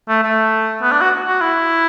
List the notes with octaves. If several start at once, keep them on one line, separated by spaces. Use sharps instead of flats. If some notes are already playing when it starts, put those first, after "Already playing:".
A3
A3
B3
D4
F#4
F#4
E4